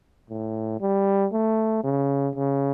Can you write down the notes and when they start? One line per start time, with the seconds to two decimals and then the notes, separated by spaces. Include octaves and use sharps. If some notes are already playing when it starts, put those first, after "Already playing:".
0.30 A2
0.81 G3
1.32 A3
1.84 C#3
2.36 C#3